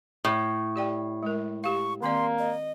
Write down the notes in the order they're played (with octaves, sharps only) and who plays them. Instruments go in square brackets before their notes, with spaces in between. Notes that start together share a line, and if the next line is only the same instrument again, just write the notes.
[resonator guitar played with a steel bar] A2
[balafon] G4 D5 G5
G#3 A#4
[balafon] G4 F5 [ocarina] C#6
[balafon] D#3 C4 D5 [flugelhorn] A#3 [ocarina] C6
[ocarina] D#5